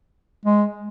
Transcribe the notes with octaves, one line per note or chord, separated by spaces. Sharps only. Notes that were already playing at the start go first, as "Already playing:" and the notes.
G#3